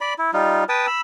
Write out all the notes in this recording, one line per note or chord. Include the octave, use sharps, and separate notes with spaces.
D5 B5
E4
G3 D#4 F4
B4 G5 A5 D#6
B5 E6